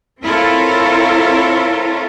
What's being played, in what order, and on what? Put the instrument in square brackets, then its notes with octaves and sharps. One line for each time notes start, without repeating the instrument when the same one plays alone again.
[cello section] C4 E4 F4 A4 A#4 C#5